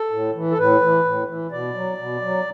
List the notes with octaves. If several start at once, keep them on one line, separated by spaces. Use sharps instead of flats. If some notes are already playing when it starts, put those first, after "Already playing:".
Already playing: A4
A2
E3
A4
A2 B4
E3
A2
E3
B2 D5
F#3
B2
F#3